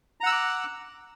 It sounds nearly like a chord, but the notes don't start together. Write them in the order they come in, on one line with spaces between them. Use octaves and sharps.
A#5 F#5 E6 F#6 D6